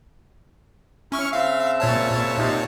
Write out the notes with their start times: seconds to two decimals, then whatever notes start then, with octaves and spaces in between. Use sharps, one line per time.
1.12 C#4 E4 C#6 F6
1.33 C#3 C4 E5 F5
1.80 A#2 C#5 A5
2.39 C3 D#4